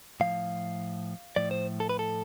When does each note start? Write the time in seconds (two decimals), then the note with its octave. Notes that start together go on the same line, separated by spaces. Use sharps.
0.20 A2 F3 F5
1.36 A2 F3 D5
1.51 C5
1.80 A4
1.89 B4
1.99 A4